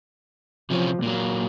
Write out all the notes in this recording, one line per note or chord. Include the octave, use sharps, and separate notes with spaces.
C3 E3 F3 C#4
A#2 F#3 A#3